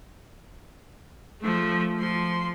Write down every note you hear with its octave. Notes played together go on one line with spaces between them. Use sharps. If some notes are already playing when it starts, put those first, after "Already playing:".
F3 A3
F3 C6